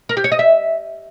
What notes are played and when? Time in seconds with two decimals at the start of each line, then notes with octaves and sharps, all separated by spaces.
0.09 A#4
0.17 G4
0.24 C#5
0.32 D#5
0.39 E5